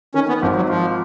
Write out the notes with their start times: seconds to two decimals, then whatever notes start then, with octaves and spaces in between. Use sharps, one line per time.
0.14 D#3 C#4
0.28 B3
0.42 G#1 F3
0.56 F#3
0.69 F3 F4